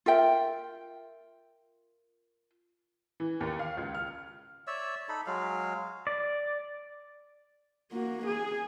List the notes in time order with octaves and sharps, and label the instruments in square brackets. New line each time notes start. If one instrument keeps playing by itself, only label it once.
[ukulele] F4 A#4 E5 G5
[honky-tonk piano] E3
D#2
F5
C#2
F6
[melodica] C#5 D5 E5 E6
D#4 A4 B5
F#3 G#3 F5
[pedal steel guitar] D5
[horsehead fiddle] A#3 F#4
G#4